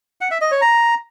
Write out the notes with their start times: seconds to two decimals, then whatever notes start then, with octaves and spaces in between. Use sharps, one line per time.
0.21 F#5
0.31 E5
0.41 D#5
0.51 C#5
0.61 A#5